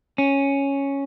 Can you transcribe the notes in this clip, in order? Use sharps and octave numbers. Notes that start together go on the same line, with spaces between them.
C#4